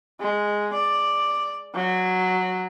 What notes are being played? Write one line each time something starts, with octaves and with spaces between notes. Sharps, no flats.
G#3
D5
F#3